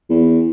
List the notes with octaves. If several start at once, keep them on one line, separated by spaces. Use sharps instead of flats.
E2